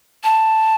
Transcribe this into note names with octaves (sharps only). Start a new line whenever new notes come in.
A5